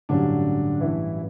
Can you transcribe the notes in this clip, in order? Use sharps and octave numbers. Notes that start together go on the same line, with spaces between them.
A1 G2 D3 F#3 C#4 D4 G4
E3 E4